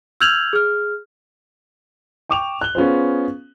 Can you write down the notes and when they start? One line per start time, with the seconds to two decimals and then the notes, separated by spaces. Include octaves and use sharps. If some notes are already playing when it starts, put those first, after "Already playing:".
0.21 E6 F6 G6 G#6 F7 F#7
0.53 G#4 F6
2.29 G5 C#6 D6 E7 F7
2.61 F#6 G7
2.75 B3 C#4 F4 G#4 C5